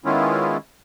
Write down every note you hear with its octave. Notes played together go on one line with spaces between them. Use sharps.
D#3 G#3 B3 C#4 E4 F4